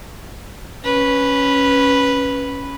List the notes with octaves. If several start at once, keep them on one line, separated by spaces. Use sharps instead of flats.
C#4 B4